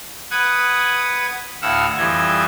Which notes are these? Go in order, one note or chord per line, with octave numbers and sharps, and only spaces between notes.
B4 F#5 D#6 G#6
D2 A2 F5 F#5 E6
F2 E3 G3 D#5 G#6